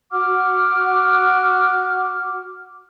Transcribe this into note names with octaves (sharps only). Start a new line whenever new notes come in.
F#4 F#5 D6 F6